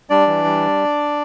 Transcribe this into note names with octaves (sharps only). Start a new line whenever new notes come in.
G3 D4 D5
E3
G3